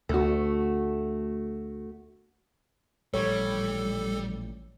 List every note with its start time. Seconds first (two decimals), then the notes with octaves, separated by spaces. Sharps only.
0.09 D2 A3 F#4
3.14 A1 A#2 F3 G3 A4 C#5